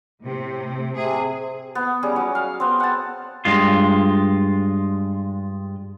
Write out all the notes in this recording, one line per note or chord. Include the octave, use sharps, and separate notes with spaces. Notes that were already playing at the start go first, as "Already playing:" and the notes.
A2 C3
C3 G#4
B3
G3 C#4 G#4 A#5
F#3
F5
B3 C4
F#5 A5
G2 G#3 F4